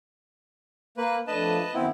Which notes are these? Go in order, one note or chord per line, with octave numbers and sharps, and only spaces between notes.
A#3 B4
F2 A3 D4 B4 D#5 A5
F#2 D#3 B3 C4 E4